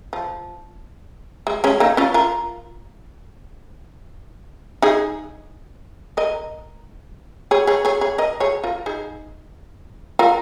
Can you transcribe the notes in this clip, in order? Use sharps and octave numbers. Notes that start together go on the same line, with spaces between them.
F3
G#3
G#3 C#4
A#3 D#4
C#4 F4
F4 A#4
D#4 G#4
A#4 D#5
G#4 C#5
G#4 C#5
G#4 C#5
G#4 C#5
A#4 D#5
G#4 C#5
F4 A#4
D#4 G#4
F4 A#4